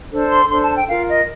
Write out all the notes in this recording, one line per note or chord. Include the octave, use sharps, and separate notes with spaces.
D4 A4 C5
C6
D4 A4 C5 C6
A5
G5
F4 A#4 F5
D#5